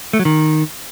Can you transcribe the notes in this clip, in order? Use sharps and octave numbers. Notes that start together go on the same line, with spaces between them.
A3
F#3
D#3